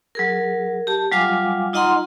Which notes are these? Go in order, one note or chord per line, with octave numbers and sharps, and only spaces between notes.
F#3 G#4 A#4
G4 A5
F#3 G3 F4 F5 G#5 D6
D#4 F4 D#5 F#5 A#5 C6